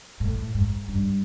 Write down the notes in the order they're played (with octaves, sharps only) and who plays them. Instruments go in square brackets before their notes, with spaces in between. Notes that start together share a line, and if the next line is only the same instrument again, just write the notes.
[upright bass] A2
G#2
G2